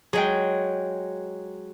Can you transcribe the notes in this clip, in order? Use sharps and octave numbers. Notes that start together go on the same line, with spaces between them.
F#3 G#3 G#4 G5